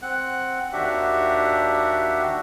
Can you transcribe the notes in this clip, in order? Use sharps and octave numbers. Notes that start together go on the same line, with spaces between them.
C4 F#5 F#6
D#2 D4 F#4 G4 E5 F#5